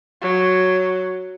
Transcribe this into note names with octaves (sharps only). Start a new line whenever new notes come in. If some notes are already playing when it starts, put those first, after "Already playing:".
F#3